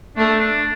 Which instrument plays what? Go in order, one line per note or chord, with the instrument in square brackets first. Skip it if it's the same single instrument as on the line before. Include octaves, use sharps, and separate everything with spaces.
[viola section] A3 [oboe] D4
[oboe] D4